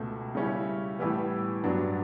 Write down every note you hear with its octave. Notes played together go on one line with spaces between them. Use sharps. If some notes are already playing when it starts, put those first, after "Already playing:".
Already playing: C#2 B2 A3
C#3 G3 C#4 E4
A2 E3 G3 B3
G2 F#3 B3 D4